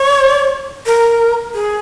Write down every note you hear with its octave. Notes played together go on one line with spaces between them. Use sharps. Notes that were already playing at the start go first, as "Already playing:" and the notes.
Already playing: C#5
A#4
G#4